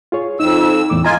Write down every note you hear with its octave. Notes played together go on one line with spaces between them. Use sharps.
F4 G#4 C#5
F2 D#4 E6
E2 A2 D6
F4 D#5 G#5 A#5